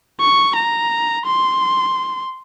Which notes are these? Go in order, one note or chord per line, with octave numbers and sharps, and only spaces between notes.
C#6
A#5
C6